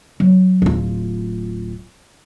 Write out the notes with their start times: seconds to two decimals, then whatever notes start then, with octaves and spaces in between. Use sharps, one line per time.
0.20 F#3
0.62 D1 F4